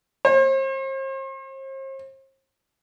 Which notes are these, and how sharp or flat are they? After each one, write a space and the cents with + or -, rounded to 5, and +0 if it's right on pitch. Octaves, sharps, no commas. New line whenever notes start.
C5 +40